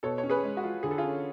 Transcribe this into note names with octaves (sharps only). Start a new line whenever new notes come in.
B2 A4 C#5
C#5
C#4
G#4 B4
G#3
F#4
F4
D3 G#4
A4
F4 G#4
C#4